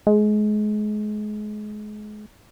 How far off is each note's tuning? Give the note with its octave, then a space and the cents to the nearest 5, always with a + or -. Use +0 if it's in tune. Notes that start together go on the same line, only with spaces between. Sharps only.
G#3 +30